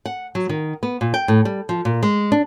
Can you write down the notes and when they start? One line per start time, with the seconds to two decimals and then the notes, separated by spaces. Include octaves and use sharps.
0.06 F#5
0.35 F#3
0.49 D#3
0.83 B3
1.01 A#2
1.14 G5
1.28 A2
1.45 G3
1.69 F3
1.85 A#2
2.03 G#3
2.32 D4